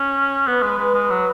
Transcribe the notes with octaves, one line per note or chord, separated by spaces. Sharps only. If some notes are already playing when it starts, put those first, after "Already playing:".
Already playing: C#4
B3 B4
G#3
G#3
G#3
F#3